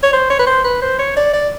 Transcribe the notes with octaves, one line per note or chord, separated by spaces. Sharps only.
C#5
C5
C#5
B4
C5
B4
C5
C#5
D5
D5